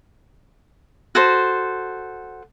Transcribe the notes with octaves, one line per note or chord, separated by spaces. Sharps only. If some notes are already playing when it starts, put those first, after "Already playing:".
F#4 A4 C5